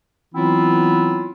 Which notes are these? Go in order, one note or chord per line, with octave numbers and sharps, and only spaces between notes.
E3 F#3 B3 C4 E4 F4